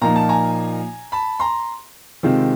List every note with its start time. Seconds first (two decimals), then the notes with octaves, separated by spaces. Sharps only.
0.01 A#2 F3 A#3 D#4 A#5
0.16 A5
0.29 G#5 A#5
1.12 A5 B5
1.40 A#5 C6
2.23 C3 D#3 G#3 C4 F4